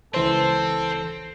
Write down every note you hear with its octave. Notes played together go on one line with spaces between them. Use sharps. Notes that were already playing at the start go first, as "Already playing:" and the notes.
C#2 E3 C4 A4 C5